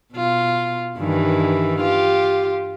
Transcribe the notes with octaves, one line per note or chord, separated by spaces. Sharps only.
B2 F4
G2 D#3 E3
F4 G4